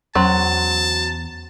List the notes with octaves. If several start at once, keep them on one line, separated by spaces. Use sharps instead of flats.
E2 F#3 C#4 C5 A5 C6